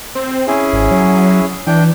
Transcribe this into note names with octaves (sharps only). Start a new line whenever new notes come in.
C4
C#4 E4 G#4
G#1
F#3
E3 D4 G5